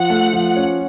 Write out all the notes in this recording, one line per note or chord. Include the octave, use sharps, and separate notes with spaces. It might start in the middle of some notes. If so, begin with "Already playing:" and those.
Already playing: F3 F#5
A3
F3
C#4